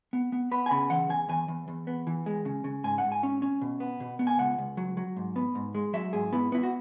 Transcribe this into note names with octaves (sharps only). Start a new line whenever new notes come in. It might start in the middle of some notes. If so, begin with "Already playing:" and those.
B3
B3
B3 B5
G#5
C#3 B5
E3 F#5
E2 G#5
E2 G#5
E2
E2
B3
E3
G#3
C#3
C#3
G#2 G#5
F#5
G#2
G#5
C#4
C#4
B2
B3
B2
B3
G#5
C#2 F#5
C#2
F#3
F#3
G#2
B3
G#2
G#3
F#3 E5
G#2 G#4
B3 E4
B3 E4
F#4